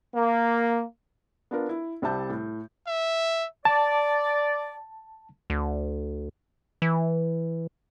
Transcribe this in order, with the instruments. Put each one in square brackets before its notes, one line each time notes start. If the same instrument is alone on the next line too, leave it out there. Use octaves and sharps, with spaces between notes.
[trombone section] A#3
[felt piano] B3 D4 F4 A#4
E4
C2 G3 C5 E5 A5 G6
A2
[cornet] E5
[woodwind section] D5 [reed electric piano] A5
[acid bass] D2
E3